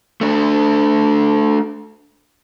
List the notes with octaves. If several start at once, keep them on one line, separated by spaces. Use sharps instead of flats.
A3 D4